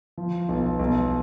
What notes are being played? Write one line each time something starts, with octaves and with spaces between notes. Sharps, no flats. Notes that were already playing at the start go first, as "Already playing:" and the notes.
F3
B1
B1